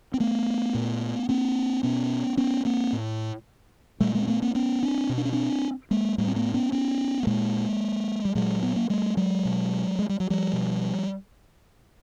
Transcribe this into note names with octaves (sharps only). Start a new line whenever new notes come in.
C4
A3 B3
A#2
A#3 C4
B2 B3 C#4
B3 C#4
A#3 C4
A2
A#2 G3 A3
G#3 A#3
C4
A3 B3
A#3 C4
B3 C#4
C4 D4
B2
D4
C#4
C4 D4
G#3 A#3
A2 G3 A3
C4
A3 B3
B3 C#4
B3 C#4
A3
A#2 G#3 A#3
G3
A#2 F#3 G#3
B3
A#3
G3 A3
F#3 G#3
B2
G#3
G3
F#3
F3 G3
B2